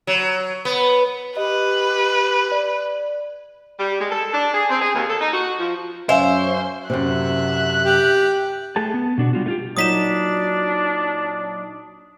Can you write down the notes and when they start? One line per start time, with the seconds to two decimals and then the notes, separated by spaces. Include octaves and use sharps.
0.07 F#3
0.65 B3
1.37 G4 B4 D#5
2.52 D5
3.79 G3
3.99 G#3
4.11 A4
4.34 D4
4.54 G#4
4.69 C4
4.81 G#4
4.94 D#2
5.08 A4
5.20 D#4
5.33 F#4
5.58 F3
6.09 F#2 C#4 C5 E5 F5 G#5
6.90 F#2 C3 E5 F#6
7.85 G4
8.76 A3 G#4 A5
8.94 B3
9.18 B2 D4 F#4
9.33 G3 F4 F#4
9.46 A3 F4 G4
9.77 A#2 F#3 D4 D#4 D#6 B6 E7